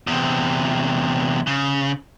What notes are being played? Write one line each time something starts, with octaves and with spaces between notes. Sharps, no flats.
E2 C3
C#3